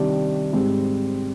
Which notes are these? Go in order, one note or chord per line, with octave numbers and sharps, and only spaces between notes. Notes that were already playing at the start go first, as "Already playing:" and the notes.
Already playing: C3 D#3 G3 D4
G#2 G3 C4